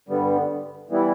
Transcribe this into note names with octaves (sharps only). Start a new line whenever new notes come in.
G2 D3 G3 B3
E3 G3 B3 E4